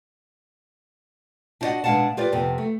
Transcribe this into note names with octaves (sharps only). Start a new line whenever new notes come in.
D4 E4 F#4 D5 D#5 F#5
B2 G#3 D4 F5 F#5 A5
F4 G4 B4 D5
F2 C3 B3
A3